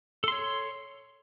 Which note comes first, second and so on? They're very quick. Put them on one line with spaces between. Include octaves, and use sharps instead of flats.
A4 C6 C#5